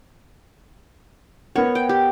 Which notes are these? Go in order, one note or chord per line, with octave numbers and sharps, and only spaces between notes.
B3 A#4 C#5 F#5
G5
G4